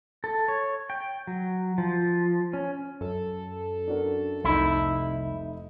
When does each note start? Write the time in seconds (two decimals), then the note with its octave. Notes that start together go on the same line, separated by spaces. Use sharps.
0.24 A4
0.48 C#5
0.90 G5
1.27 F#3
1.78 F3
2.53 C#4
3.01 F#2 A4
3.88 D4 F#4 A#4
4.44 F1 C2 D#4 E4